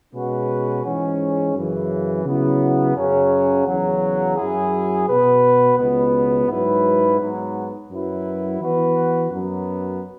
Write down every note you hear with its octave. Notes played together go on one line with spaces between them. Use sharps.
B2 G#3 C#4 F#4 B4
G#2 E3 G#3 C#4
F#2 C#3 E3
C#3 F#3 B3 E4
F#2 C#3 F#3 C#4
E2 C#3 F#3
F#2 F#3 E4 G#4
B2 B3 F#4 B4
C#2 B2 B3
G#2 F#3 E4 B4
G#2 F#3 B3
F#2 F#3 E4 B4
E3 B3 F#4 B4
F#2 F#3 B3